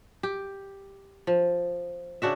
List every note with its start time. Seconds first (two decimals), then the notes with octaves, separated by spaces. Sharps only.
0.23 G4
1.27 F3
2.22 C#3 D4 F#4 E5